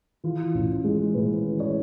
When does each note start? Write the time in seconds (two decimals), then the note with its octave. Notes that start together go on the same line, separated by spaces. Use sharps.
0.24 E3 F4
0.54 A1
0.84 G#3
1.14 A2 B4
1.45 E3
1.60 C#5